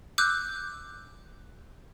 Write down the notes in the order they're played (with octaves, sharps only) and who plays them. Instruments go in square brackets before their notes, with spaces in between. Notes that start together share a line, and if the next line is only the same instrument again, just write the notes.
[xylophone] D6 E6 F#6 G6